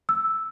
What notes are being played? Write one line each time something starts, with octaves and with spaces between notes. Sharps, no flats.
E6